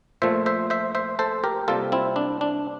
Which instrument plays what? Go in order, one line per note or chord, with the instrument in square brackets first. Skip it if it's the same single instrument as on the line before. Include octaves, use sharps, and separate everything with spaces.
[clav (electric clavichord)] A#2 F3 A3 C5 E5
C5 E5
C5 E5
C5 E5
A4 C5
G4 A#4
C3 G3 A#3 F4 A4
C4 E4
D4
D4